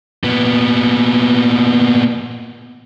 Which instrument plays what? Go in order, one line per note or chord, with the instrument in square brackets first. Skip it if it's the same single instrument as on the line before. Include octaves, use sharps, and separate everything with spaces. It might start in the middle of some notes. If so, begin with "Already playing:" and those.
[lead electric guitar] A#2 B3